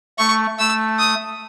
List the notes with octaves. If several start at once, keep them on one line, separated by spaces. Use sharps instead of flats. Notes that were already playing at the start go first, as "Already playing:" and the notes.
A3 C#6
A3 E6
D#6